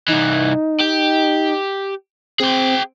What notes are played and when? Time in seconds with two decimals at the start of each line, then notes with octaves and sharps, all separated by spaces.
0.08 C2 E3 D#4
0.81 G4
2.40 C4 G#4 G5